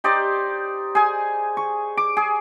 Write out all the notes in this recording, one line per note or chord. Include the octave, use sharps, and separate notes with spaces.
D#4 G4 C5 D5
G#4 G#5
C#6
D6
G#4